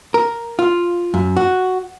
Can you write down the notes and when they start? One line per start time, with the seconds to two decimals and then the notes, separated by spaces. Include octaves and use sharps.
0.14 A#4
0.59 F4
1.14 F#2
1.36 F#4